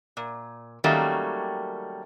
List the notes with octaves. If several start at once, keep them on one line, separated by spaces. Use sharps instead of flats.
A#2
D#3 F#3 G3 A3 A#3 C#4